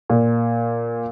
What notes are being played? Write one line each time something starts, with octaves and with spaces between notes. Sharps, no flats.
A#2